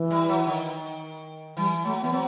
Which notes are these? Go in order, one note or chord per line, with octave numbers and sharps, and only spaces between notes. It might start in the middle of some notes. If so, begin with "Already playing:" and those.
Already playing: E3
G3
F#3
D#3
E3 G3
F#3 A3
E3 B3
F#3 C4